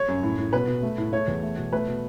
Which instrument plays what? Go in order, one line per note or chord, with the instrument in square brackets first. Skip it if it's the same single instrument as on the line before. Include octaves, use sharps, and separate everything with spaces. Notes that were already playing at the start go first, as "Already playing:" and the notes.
Already playing: [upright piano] C#5
F#2
A2
A2
B2 B4
B2
A3
A2
A3 C#5
E2
A3
B2
A3 B4
B2